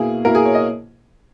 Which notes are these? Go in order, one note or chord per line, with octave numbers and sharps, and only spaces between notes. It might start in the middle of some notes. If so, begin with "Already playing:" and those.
Already playing: B2 A#3 E4 G#4
B2 A#3 E4 A#4
G#4
C#5
D#5